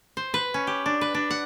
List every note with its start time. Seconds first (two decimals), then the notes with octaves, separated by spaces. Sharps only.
0.17 C5
0.34 B4
0.54 C#4
0.67 G4
0.86 D4
1.01 B4
1.14 D4
1.31 F#5